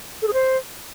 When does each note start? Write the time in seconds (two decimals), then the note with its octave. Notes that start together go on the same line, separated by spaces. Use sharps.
0.22 A4
0.28 G#4
0.33 C5